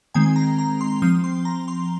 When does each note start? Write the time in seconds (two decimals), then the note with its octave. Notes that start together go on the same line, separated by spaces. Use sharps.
0.14 D#3 G#3 C4 G#5
0.36 A#5
0.59 A#5
0.81 C6
1.02 F3 C4 D#6
1.24 C6
1.45 A#5
1.68 C6